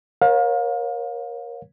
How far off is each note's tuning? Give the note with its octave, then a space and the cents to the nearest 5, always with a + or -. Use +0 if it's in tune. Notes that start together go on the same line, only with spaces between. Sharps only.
A#4 +20 C#5 -25 F5 +35